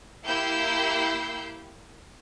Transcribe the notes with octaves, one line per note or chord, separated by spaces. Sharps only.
A#3 E4 G4 E6 G6 C7